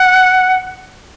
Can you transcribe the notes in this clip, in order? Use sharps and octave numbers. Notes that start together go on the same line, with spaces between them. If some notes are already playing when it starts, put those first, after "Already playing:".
Already playing: F#5